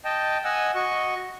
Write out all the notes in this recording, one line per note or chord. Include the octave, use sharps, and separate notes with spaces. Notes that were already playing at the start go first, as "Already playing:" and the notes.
D#5 G5 A5
D#5 F#5 G#5 E6
F#4 D#5 C#6